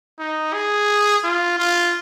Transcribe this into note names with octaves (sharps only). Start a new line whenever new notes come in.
D#4
G#4
F4
F4